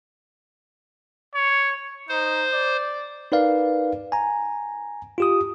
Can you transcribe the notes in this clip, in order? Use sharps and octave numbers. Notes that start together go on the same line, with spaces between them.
C#5
D#4 C5
D5
D#4 A#4 B4 D5 F5
G#5 A#5
F4 G4 D#6